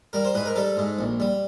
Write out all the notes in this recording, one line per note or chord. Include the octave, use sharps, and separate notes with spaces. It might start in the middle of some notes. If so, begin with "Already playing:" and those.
G3 A#4
C5
G#2 B4
A#4
G3 A4
G#2
A#1
G3